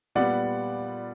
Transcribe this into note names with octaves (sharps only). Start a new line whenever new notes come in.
A#2 G3 B3 D5 F#5